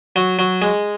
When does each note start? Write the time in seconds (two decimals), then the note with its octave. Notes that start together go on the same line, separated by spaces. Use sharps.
0.16 F#3
0.39 F#3
0.62 G#3